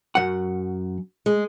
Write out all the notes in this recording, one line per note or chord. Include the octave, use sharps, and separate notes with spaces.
F#2 F#5
G#3